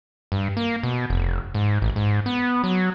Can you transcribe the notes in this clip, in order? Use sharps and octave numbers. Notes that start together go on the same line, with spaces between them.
G2
A#3
B2
F1
G#2
A1
G#2
B3
F#3